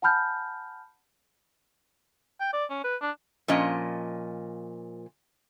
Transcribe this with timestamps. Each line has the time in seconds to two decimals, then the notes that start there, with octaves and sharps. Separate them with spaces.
0.02 F#5 G#5 A5 B5 F6 G6
2.41 G5
2.53 D5
2.70 C#4
2.84 B4
3.01 D4
3.48 A#2 F3 C#4 D#5